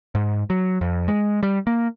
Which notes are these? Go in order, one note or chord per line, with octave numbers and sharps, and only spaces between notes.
G#2
F#3
F2
G#3
G3
A#3